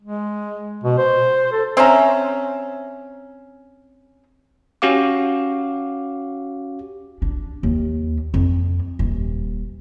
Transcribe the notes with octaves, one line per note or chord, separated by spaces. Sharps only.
G#3
B2
C5
A4
C4 C#4 E5 A#5
C#4 F#4 G4 F5 D6
D4
D#2
F2
D#1